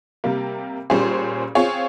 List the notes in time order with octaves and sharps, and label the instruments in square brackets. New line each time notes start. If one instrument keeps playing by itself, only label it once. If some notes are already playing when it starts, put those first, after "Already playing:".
[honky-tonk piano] C3 G3 A#3
A#2 G3 C#4 G#4 C5
C4 F4 G#4 C#5